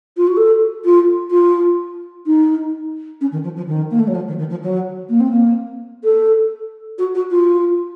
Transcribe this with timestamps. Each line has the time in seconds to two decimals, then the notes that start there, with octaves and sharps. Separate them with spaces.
0.17 F4
0.27 F#4
0.37 A4
0.84 F4
1.30 F4
2.26 D#4
3.21 C#4
3.32 D#3
3.44 F3
3.56 F3
3.67 D#3
3.91 A#3
3.99 A3
4.07 F#3
4.15 F3
4.27 D#3
4.38 D#3
4.50 F3
4.63 F#3
5.09 A#3
5.20 C4
5.31 A#3
6.04 A4
6.98 F#4
7.14 F#4
7.31 F4